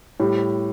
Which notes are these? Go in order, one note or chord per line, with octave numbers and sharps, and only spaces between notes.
A2 G3 G4